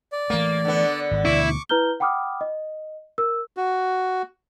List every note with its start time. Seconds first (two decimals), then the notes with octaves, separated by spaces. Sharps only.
0.12 D5
0.30 E3 A3 A#3
0.65 D3 B3
1.11 G#1
1.25 D2 B2 E3 E4 C#6 D6
1.69 E4 B4 A#5 F6 G6 G7
2.00 F#5 G5 B5 D6 D#6 F6
2.41 D#5
3.18 A#4 E6
3.57 F#4